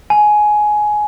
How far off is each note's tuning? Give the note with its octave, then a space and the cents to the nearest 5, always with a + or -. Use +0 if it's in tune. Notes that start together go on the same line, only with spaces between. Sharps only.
G#5 +15